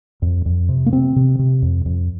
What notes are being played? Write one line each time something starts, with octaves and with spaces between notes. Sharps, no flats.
F2
F2
C3
A#3
C3 C4
C3
C3
F2
F2